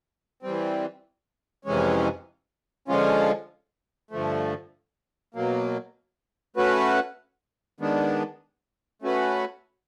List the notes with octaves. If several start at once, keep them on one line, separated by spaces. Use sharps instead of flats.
E3 G3 C4
F2 C3 E3 G#3 C#4
D3 F3 G#3 C#4 F4
G2 D3 F3 A3
B2 F#3 A#3
A3 C#4 F#4 B4
D#3 G#3 B3 D4
A3 C#4 F#4 B4